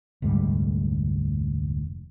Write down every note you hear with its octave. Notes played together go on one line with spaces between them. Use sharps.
F1 D2 G#2 G3